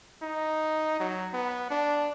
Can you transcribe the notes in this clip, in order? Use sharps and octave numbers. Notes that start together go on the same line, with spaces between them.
D#4
F#3
B3
D4